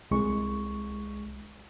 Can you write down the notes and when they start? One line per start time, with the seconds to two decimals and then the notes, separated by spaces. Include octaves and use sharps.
0.11 C2 G#3 C#6